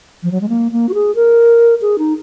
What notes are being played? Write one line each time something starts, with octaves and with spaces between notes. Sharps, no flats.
F3
F#3
G#3
A#3
A#3
F#4
G#4
A#4
G#4
D#4